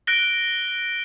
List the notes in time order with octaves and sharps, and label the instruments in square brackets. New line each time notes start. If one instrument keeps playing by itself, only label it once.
[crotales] F#6 A#6 D7 G7